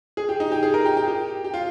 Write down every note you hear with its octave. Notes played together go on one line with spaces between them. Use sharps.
G#4
G4
D#4
G4
G#4
A#4
G4
G4
G4
G4
F4